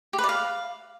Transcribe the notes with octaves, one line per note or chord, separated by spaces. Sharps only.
G4
B4
D5
F5